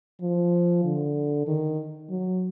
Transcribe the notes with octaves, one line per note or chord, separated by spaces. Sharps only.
F3
D3
D#3
F#3